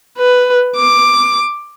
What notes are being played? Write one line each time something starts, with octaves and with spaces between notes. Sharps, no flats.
B4
D6